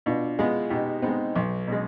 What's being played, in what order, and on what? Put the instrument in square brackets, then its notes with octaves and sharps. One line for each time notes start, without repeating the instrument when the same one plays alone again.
[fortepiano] B2 [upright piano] D4 F4
[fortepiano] G#3 B3 [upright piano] F4 G#4
[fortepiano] B2 [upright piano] D#4 G4
[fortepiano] G#3 B3 [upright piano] C4 D#4
[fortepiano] B1
B2 G#3